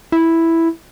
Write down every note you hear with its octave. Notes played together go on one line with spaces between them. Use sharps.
E4